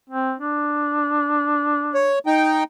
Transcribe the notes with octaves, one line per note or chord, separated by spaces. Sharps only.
C4
D4
C#5
D#4 G5